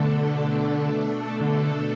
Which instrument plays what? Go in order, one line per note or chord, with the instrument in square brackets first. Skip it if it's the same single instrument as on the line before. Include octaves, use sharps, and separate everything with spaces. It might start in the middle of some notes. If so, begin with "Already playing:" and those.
Already playing: [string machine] B2 A3 D4 A4 [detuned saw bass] D3
[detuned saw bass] D3